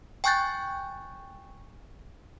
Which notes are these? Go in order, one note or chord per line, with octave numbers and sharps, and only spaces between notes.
G5 G#5 C#6 F#6 G6 A6